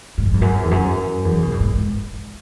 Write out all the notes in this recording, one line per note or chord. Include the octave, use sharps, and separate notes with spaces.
G#2
F#2
E2
F#2
E2
F#2
E2
C#3
B2
A2
G#2